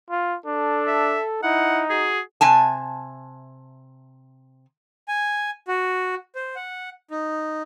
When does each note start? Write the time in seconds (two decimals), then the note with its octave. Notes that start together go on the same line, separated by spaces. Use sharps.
0.10 F4
0.46 D4 A4
0.87 E5
1.43 D#4 E4 F#5
1.90 F#4 G#4
2.41 C3 G#5 A5
5.08 G#5
5.68 F#4
6.35 C5
6.56 F#5
7.11 D#4